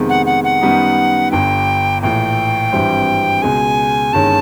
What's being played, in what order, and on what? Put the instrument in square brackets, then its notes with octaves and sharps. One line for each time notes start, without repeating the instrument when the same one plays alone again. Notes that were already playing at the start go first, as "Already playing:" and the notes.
Already playing: [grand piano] F2 C3 D#3 G#3 B3
[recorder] F#5
F#5
F#5
[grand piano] F#2 D#3 G3 B3 D#4
[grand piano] G1 G2 D3 [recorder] G5
[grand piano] A#1 A2 E3 [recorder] G5
[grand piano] G#1 G2 E3 G3 C4
[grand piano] C#2 B2 G#3 [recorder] G#5
[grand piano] G1 G2 D#3 G#3 C#4 [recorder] A5